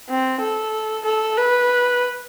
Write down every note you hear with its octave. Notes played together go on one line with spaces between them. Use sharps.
C4
A4
A4
B4